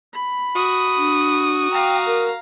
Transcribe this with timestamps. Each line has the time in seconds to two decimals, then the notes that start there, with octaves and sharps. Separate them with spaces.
0.14 B5
0.56 F#4 D#6
0.97 D4
1.71 F5 G5 A#5
2.06 A#4